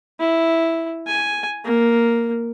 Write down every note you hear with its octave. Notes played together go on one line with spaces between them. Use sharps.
E4
G#5
A#3